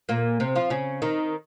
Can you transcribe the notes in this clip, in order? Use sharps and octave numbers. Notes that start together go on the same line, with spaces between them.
A#2 A#3
C3 C4
F3 F4
C#3 C#4
D#3 D#4